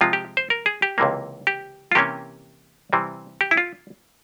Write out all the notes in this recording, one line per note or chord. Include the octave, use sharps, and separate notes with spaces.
C3 F3 G#3 F4
G4
C5
A#4
G#4
G4
C#2 C3 E3 A#3
G4
F4
C3 E3 A#3 C#4 G4
C3 E3 G3 C4
G4
E4
F4